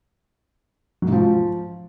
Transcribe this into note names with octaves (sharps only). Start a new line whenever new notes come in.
F#3
G#2
F3